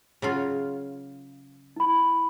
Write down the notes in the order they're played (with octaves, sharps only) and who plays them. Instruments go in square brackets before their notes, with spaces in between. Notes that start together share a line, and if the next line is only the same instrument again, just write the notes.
[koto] C#3 F#3 F4
[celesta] E4 B5